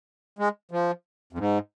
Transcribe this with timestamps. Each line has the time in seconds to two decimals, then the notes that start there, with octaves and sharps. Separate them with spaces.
0.39 G#3
0.71 F3
1.33 F2
1.38 G#2